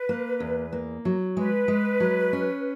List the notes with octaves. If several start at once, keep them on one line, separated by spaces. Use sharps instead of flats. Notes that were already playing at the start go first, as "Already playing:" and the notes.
Already playing: B4
A#3
E2
A#3
F#3
G#3 B4
G#3
F#3
C#4